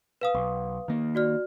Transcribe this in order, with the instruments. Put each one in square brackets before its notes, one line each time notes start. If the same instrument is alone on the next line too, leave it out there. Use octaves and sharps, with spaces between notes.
[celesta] B4 F5 D#6
[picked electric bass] B1
D#3 A#3
[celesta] F#4 D5 F6